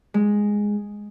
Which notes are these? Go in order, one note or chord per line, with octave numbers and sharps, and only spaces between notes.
G#3